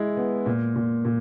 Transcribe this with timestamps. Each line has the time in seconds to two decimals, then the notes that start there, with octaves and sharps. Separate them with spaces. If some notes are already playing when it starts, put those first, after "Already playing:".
Already playing: G#3 E4
0.17 B3
0.46 A#2
0.76 A#2
1.05 A#2